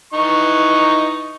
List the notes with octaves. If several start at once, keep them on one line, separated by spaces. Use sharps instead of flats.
E3 D#4 C#6